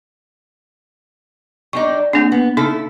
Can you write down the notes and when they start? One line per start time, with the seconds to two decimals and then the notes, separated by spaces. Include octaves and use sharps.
1.73 G3 D4 D#4 C#6
2.13 A#3 C4 D4 G#4
2.32 B3
2.57 C#3 D#4 E4 A4